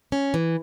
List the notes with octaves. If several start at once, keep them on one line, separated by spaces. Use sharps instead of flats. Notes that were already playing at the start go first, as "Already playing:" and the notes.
C#4
E3